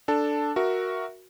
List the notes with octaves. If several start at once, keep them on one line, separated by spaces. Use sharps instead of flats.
D4 A4 A5
F#4 A#4 E5